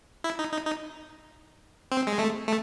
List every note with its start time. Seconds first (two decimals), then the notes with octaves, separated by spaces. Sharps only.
0.24 E4
0.39 D#4
0.52 D#4
0.66 D#4
1.92 C4
2.07 G#3
2.19 A3
2.47 A3